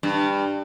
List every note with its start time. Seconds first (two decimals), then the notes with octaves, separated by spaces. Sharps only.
0.03 G2